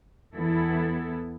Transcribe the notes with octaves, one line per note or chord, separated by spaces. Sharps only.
E2 E3 B3 E4 A4